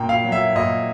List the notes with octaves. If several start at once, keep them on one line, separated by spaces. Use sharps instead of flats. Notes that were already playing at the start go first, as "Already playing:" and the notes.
Already playing: A#2 A#3 G5 A#5
F5
F#3
E5
A#2 D#5